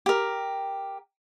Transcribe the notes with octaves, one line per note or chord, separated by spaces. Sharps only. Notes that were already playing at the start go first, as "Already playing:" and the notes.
G4 A#4